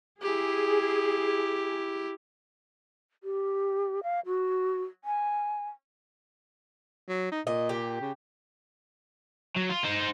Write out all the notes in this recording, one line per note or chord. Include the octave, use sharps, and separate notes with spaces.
E4 G4 G#4
G4
F5
F#4
G#5
F#3
D#4
A#2 D#5
G4
C#3
F#3
F4
D#4 C5